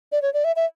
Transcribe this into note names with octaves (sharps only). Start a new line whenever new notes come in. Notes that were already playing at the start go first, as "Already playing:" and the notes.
D5
C#5
D5
E5
E5